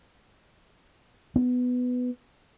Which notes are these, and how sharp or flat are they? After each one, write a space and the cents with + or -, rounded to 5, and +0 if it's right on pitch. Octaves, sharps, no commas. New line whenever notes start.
B3 +10